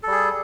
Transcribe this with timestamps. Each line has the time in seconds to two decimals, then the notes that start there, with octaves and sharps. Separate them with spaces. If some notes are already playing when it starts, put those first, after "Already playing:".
0.03 A4
0.07 G3
0.11 G#4